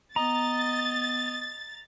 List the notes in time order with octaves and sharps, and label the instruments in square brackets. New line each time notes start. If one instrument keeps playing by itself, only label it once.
[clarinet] B3 [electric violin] D#5 [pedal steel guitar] A#5 [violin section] A6